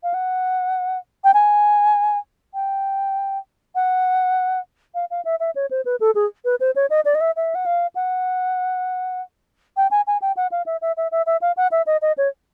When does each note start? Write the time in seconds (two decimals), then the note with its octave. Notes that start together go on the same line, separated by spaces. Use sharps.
0.03 F5
0.14 F#5
1.24 G5
1.34 G#5
2.54 G5
3.75 F#5
4.94 F5
5.10 F5
5.25 E5
5.40 E5
5.55 C#5
5.70 C5
5.85 B4
6.00 A4
6.15 G#4
6.45 B4
6.60 C5
6.75 C#5
6.90 D#5
7.05 D5
7.15 D#5
7.21 E5
7.36 E5
7.55 F#5
7.66 F5
7.95 F#5
9.77 G5
9.91 G#5
10.07 G#5
10.22 G5
10.37 F#5
10.51 F5
10.66 E5
10.81 E5
10.97 E5
11.12 E5
11.26 E5
11.41 F5
11.57 F#5
11.71 E5
11.86 D#5
12.02 D#5
12.17 C#5